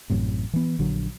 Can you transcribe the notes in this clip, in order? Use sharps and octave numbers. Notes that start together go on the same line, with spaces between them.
A1 F#2 A2 C3
E3 B3
A#1 D3 F#3